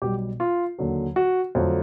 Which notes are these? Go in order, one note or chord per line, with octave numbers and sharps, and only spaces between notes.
B1 B2 G3 G4
F4
D#2 D3 F#3
F#4
F2 D3 F#3 A3 C4